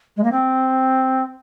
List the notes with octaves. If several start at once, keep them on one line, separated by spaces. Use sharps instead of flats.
G#3
A#3
C4